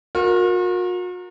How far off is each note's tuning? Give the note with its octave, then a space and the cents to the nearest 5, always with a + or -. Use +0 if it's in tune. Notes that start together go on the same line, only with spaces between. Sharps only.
F#4 -45 A#4 +0